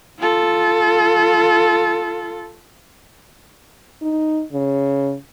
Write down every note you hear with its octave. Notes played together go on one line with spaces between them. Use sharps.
F4 A4
D#4
C#3